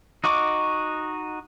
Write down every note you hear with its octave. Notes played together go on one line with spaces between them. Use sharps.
D#4 F#4 D#5 C#6 D6